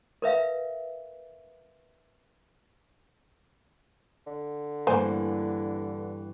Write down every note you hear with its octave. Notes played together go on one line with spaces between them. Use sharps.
A#4 B4 E5 F5
D3
G2 E3 A#3 C5 G#5